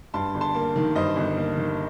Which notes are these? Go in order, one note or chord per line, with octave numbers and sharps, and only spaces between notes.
G2 A5 C6
G1
A5 C6
A#3
D#3
G2 C5 D#5
G1
A#3
D#3